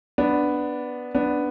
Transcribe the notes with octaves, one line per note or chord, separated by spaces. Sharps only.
B3 D4
B3 D4